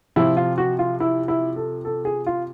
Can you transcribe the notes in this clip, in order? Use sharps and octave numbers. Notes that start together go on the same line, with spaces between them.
C3 F3 E4
F4
F#4
F4
E4
E4
A4
A4
G#4
F4